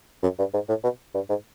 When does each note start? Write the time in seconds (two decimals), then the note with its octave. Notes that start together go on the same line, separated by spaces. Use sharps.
0.23 F#2
0.39 G2
0.54 G#2
0.69 A2
0.84 B2
1.15 G2
1.29 G#2